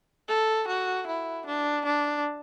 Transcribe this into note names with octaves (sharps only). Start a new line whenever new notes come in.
A4
F#4
E4
D4
D4